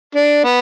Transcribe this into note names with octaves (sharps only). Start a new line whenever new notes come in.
D4
B3